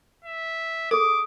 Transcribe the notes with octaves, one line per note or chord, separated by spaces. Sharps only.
E5
G#4 A4 D6 D#6